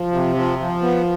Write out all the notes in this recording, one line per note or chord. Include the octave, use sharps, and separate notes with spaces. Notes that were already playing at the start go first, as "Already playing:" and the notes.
Already playing: F3
C3
F3
F3
B3